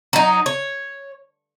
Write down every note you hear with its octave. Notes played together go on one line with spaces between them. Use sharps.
F#3 D#4
C#5